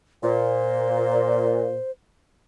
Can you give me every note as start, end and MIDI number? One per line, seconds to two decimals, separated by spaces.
0.23 1.77 46
0.23 1.91 72